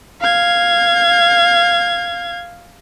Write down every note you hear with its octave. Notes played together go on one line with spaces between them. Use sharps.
F5 G#6